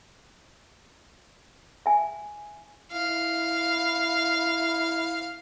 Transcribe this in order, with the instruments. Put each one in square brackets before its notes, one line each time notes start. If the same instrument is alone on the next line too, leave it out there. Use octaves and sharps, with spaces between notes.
[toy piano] E5 G#5
[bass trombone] E4 [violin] F5